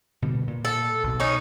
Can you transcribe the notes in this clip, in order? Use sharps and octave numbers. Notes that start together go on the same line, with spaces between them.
B2 D3 G3
A#2
A4
B1 B2
C#4 D#4